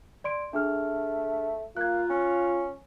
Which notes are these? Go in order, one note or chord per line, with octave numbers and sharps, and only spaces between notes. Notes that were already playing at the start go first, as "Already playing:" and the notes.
D5 C6 D7
A3 D4 G#4 F6
A#3 F4 F#6 G#6
C#4